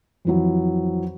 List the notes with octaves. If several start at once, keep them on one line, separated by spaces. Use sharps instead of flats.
F2 E3 F#3